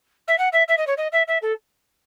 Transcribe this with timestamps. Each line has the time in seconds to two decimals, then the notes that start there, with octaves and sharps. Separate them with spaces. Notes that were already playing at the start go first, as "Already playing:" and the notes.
0.28 E5
0.38 F#5
0.52 E5
0.68 E5
0.77 D#5
0.87 C#5
0.97 D#5
1.12 E5
1.27 E5
1.42 A4